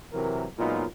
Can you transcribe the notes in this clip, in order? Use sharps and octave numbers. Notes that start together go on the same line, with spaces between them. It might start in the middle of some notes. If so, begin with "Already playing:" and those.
C3 E3 F#3 A#4
A#2 F#3 G#3 B3 D#4 F4